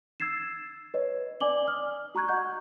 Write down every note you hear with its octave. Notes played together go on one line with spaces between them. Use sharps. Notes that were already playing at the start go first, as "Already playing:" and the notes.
E6 G#6 A6 C7 E7
B4 C#5 D#5
D5 G#5 D6 F#7 G7
D#6 F6
F#4 A#5 C#6 F#6 G#6
D#5 F#5 C#6 G6